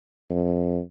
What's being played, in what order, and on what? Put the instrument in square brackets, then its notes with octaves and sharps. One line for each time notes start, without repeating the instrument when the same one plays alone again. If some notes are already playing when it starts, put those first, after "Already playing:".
[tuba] F2